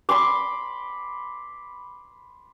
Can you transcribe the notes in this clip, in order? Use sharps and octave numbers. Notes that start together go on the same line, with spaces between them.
B5 C6 D6